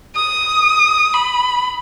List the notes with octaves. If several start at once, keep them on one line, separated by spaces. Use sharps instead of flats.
D#6
B5